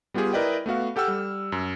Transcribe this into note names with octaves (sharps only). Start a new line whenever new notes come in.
G3 B3 F4 G4 G#4
E4 A#4 B4 D5 D#5 G5
A3 B3 F#4 F5
G4 A4 F#5 G5 E6 F6
G3
F#2